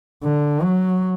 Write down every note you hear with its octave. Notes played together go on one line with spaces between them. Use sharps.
D3
F#3